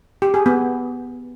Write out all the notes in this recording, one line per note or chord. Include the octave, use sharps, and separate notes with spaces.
G4
G#4
B3